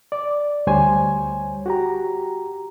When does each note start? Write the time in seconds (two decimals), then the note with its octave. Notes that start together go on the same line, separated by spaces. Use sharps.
0.12 D5
0.67 D2 G3 C5 C#5 G#5
1.66 F#4 G4 A#5